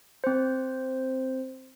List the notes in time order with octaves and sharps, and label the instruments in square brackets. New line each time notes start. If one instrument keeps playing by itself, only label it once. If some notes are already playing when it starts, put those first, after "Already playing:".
[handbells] C4 C5